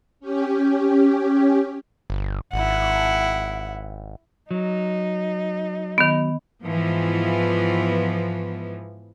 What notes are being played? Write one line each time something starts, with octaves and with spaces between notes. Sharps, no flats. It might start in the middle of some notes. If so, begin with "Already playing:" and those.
C#4 G4
G1
G#1 E4 F#5
F#3 D#4
D#3 B3
G#2 E3 F3 B3